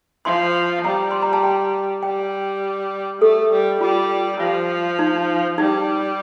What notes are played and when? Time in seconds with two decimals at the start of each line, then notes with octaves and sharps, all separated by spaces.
0.25 F3 C6
0.84 G3 A#5
1.11 C6
1.22 A#5
1.33 A5
1.43 G5
2.03 G3 G5
3.22 A3 A4
3.51 G3
3.81 G3 F4
4.40 F3
4.99 D#4
5.58 G3 D#4